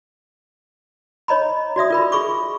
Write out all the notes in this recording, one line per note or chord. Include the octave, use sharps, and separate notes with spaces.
C#5 D#5 A#5 B5
F#4 D5 E5 D#6
F4 A#4 B5
G#4 B5 C#6 D6